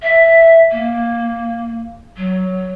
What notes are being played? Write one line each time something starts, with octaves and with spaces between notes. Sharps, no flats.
E5
A#3
F#3